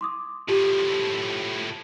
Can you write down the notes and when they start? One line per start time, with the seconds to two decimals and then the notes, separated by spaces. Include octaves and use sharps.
0.01 C6 D6 D#6
0.48 A2 F3 F4 G4